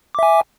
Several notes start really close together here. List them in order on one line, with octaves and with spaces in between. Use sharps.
D6 E5 G#5